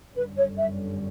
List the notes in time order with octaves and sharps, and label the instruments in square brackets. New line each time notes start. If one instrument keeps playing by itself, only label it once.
[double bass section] G1 F#2 D3 G3 C#4 [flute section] B4
[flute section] C#5
E5